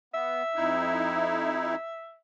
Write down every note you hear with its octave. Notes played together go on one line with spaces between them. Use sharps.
B3 E5
F2 D#4 E4